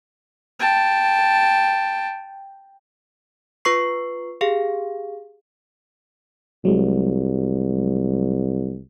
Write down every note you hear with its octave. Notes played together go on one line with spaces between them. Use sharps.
G5 A5
F4 B4 C#6 C7
G4 G#4 F5
C2 F#3 G#3